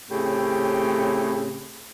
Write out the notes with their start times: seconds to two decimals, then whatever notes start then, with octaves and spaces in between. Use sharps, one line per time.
0.11 A2 C#3 C4 G4